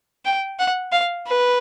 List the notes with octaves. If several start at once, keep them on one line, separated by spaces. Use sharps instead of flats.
G5
F#5
F5
B4